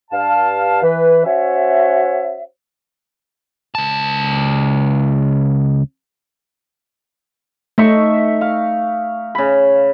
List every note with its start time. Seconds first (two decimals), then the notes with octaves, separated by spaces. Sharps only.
0.11 G2 F5 A5
0.82 E3 B4
1.25 C#4 F#4 C5 C#5 E5
3.75 C#2 A5
7.78 A3 D#4 E5 C#6
8.41 F5
9.35 C#3 B5